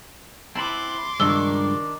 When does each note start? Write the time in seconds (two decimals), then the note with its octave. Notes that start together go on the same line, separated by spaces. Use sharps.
0.56 C4 E4 B4 A5 C6 D6
1.20 C#2 G2 D#3 D4 E6 G7